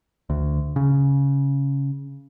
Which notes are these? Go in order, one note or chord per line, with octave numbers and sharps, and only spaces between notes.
D2
C#3